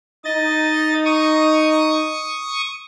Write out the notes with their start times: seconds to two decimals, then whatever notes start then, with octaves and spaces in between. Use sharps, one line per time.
0.25 D#4 D#5 A6
1.05 C#6 D#6